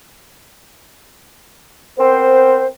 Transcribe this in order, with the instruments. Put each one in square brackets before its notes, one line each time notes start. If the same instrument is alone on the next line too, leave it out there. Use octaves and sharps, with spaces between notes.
[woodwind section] B3 C4 A#4 C5